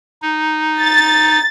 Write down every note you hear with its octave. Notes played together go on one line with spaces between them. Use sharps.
D#4
A6